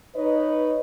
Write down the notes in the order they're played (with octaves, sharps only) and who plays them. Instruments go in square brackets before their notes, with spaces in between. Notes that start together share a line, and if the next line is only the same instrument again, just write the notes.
[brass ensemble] D#4 B4 C#5 D#5